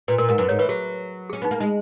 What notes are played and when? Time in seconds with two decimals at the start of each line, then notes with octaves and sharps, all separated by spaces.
0.08 A#2 B4
0.18 A#2 A#4
0.29 G#2 A#4
0.38 F#2 B4
0.49 G#2 C#5
0.59 E3 B4
0.69 F#3 G#4
1.30 C#4 G#4
1.42 B3 D#4
1.51 A#3
1.60 G#3 D#4